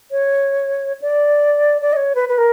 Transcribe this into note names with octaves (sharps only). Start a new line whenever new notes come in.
C#5
D5
D5
D#5
C#5
B4
B4
A#4